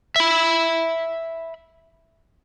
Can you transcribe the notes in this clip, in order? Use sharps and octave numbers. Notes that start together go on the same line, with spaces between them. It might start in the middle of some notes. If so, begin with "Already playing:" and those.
E5 B5